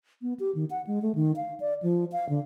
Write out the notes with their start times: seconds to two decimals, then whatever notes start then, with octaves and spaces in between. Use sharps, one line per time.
0.22 B3
0.40 G4
0.55 D#3
0.70 F#5
0.87 G#3
1.02 A3
1.15 D#3
1.36 F5
1.60 D5
1.82 F3
2.12 F5
2.29 D3